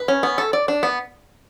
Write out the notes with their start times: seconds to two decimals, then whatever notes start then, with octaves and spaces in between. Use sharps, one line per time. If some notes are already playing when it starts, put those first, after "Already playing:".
Already playing: B4
0.08 C#4
0.23 B3
0.38 A4
0.53 D5
0.68 D4
0.83 B3